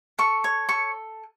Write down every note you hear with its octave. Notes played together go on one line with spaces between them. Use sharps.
A4 C#6
C#5
A4 C#6